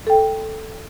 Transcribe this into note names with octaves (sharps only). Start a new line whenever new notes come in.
A4 G5